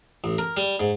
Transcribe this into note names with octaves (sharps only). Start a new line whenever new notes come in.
A1
A#4
G3
G#2